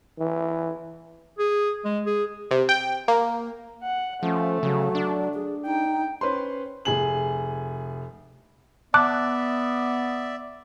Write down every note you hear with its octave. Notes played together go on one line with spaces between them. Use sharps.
E3
G#4
G#3
G#4
C3
G5
A#3
F#5
F3 A3 C#4
C#3 F#3
D4
G#4
D#4 G5
C#4 B4 C5 C6
F1 G#4 F#7
B3 D5 E5 A5 D6 F#6